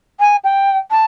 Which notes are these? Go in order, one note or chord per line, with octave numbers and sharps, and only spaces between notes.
G#5
G5
A5